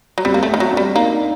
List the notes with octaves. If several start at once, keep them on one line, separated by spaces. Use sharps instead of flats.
F#3
G3 C4
A#3
A3
C4
D#3
F#3
D4
G3
A#3 D#4